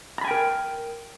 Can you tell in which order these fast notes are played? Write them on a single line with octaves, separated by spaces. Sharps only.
A#5 B5 G#5 G5 A#4